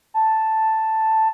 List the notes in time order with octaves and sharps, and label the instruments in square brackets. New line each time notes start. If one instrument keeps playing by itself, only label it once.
[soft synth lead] A5